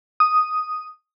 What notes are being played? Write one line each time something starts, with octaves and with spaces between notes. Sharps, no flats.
D#6